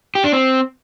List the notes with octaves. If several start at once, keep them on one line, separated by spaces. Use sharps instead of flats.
G4
D4
C4